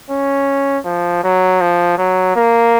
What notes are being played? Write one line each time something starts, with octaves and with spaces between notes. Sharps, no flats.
C#4
F3
F#3
F3
F#3
A#3